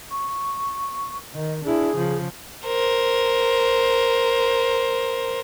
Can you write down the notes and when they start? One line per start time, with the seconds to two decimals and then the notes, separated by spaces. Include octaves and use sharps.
0.11 C#6
1.35 D#3 D#5
1.64 D4 E4 G#4
1.96 C#3 F3
2.66 A#4 C5